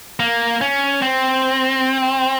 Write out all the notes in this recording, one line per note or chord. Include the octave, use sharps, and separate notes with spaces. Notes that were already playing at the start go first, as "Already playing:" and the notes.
A#3
C#4
C4